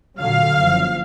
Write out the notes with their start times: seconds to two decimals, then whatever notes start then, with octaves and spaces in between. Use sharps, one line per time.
0.20 A#2 D3 F#3 F5
0.58 F#1 F3